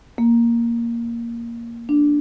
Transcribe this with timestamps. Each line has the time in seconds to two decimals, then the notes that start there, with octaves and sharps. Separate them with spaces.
0.18 A#3
1.89 D4